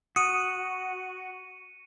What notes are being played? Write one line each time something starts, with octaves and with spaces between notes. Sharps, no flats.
F#4 D#6 C#7 D#7